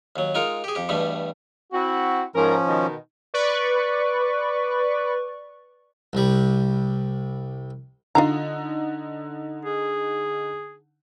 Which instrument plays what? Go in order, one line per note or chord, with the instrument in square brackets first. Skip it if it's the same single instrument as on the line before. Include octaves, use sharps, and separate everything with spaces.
[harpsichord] D#2 F#3
G#3 D#4 F4 A#4
G4 G#4
F2 G4
E2 G2 B2 G3 A3
[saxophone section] C4 E4 F#4
[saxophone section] G#2 A#4 [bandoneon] F3 C#4
[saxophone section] B2 D#3 D#4
[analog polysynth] B4 D5 C#6
[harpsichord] C2 G3
[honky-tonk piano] D3 D#4 [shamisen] F4 F5 A#5
[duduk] G#4